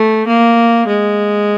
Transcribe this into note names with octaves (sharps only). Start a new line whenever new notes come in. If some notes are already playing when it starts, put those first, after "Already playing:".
Already playing: A3
A#3
G#3